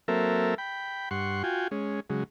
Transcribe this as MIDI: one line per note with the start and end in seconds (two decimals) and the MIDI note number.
0.08 0.55 54
0.08 0.55 58
0.08 0.55 60
0.08 0.55 69
0.08 0.55 70
0.08 0.55 76
0.58 1.09 79
0.58 1.09 83
1.11 1.43 43
1.11 1.43 78
1.11 1.43 84
1.11 1.43 85
1.43 1.68 65
1.43 1.68 66
1.43 1.68 79
1.43 1.68 80
1.71 2.00 56
1.71 2.00 61
2.10 2.24 49
2.10 2.24 54
2.10 2.24 56